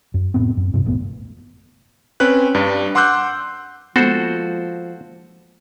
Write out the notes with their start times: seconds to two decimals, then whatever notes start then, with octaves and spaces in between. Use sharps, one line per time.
0.14 F#2
0.34 F1 A2 B3 C4
0.57 F#2
0.74 G2 C3
0.85 D#1 G#1 A2 B3
2.20 C4 C#4 B4 F#6
2.55 G2 G3
2.95 F#5 C6 D6 E6 F#6 G6
3.96 F3 G#3 A#3 B3 F#4 A4 C5